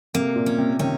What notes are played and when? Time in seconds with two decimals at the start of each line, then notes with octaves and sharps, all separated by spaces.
0.14 C3 A#3
0.36 A#2
0.46 C#4
0.58 C3
0.79 C3 D#3 C#4